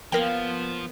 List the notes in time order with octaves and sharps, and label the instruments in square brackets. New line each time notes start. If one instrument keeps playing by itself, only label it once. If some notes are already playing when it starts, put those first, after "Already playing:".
[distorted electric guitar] F3 [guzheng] A#3 F5 [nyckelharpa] B3 [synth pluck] A#4 G5